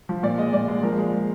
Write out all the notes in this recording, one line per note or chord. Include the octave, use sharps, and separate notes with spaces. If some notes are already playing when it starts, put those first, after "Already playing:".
F3
A#2 D5
G#3 D#5
A#2 D5
G#3
F3 A#4
G#3